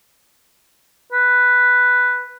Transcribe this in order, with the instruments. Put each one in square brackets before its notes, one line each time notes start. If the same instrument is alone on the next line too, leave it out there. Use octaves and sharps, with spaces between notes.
[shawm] B4